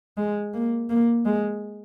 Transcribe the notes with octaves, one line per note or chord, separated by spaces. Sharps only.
G#3
A#3
A#3
G#3